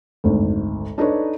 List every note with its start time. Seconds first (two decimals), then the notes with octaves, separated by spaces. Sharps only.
0.24 G#1 D2
0.98 D4 D#4 A4 B4 C#5